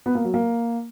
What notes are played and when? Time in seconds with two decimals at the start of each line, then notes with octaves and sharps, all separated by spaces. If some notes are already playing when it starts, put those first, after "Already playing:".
0.06 B3
0.15 A#3
0.24 F#3
0.34 A#3